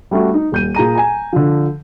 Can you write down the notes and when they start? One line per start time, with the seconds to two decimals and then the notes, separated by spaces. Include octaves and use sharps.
0.11 G3 A3 C#4 F#4
0.34 D#4
0.52 D#1 G6 D#7
0.75 A#2 G#4 A#5 D#7
0.95 G#5 A#5
1.33 D3 F3